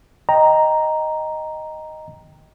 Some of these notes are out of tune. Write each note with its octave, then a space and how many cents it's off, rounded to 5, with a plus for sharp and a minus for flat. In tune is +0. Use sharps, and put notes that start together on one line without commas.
D#5 +0 G5 +0 A#5 +0